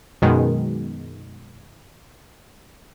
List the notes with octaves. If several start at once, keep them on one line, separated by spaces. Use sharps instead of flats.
F#2 B2 D#3 G#3